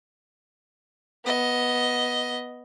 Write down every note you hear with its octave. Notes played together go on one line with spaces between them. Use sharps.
B3 D#5